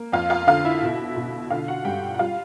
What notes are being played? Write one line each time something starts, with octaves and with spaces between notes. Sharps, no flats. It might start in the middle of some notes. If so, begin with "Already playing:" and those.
Already playing: A#3
F2 F4 F5
F4 F5
D3 F4 F5
E4 E5
B2
B2
D3 F4 F5
F#4 F#5
G2 G4 G5
F#5
G3 F4 F5